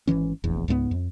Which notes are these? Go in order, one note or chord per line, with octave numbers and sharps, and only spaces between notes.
G#1 E2 E3 C#4
F1 A#1 E2
C#2 G#2 A3 B3
F2